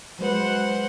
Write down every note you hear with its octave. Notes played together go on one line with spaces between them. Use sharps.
F#3 G#3 B4 C5 F#5